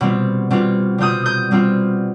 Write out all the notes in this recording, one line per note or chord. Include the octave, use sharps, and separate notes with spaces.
B2 G3 C4 F4
B2 G3 C4 F4
B2 G3 C4 F4 D#6 G6
D#6 G6
B2 G3 C4 F4